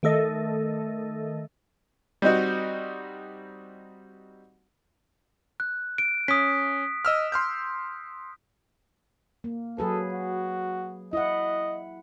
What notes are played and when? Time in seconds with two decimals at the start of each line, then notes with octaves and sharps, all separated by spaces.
0.03 D#3 A3 A4 D#5
2.22 G3 C4 D#4 F#4
5.60 F#6
5.98 D7
6.28 C#4 D#6 B6
7.05 D#5 E6 F6
7.32 C6 F6 G6
9.44 A#3
9.78 F#3 G#4 A4 B4
10.12 F#4
11.13 E4 D#5 F#5